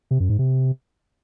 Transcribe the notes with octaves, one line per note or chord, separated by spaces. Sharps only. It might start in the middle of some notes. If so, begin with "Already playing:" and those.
C3
F#2
G#2
C3